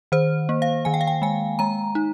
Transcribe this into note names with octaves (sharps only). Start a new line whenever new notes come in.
D#3 C5
A#3
F5
D#3 G#5
G5
F5
G5
G#3 G#5
G#3 A#5
D#4